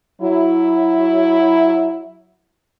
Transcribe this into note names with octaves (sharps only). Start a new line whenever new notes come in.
F#3 E4